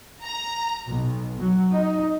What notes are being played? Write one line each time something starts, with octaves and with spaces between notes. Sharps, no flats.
A#5
B1
F#3
D#4